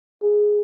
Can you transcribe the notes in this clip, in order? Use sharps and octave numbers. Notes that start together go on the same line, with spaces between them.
G#4